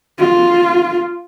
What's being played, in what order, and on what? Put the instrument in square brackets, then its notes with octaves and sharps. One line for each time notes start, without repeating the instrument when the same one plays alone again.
[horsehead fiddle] F4